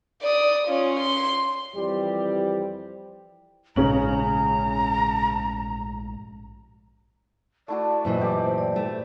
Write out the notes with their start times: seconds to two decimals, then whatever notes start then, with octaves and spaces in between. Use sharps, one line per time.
0.22 D5 D#6
0.67 C#4 F4
1.00 C6
1.75 F2 E3 G3 C4 G4
3.76 A#1 G#2 C#3 C#4 A#5 F#7
7.68 A3 E4 F#4 D5
8.05 F#2 A#2 E3 C5 D#5
8.21 G4 D5 D6
8.40 C5
8.58 D5
8.76 A3